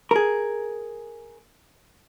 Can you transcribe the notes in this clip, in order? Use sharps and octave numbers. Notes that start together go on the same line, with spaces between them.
G#4 A#4